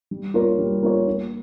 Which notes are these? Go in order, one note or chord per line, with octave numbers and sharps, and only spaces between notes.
G3
A#3 F4 A#4 C#5
G3
A#3 F4 A#4 C#5
A#3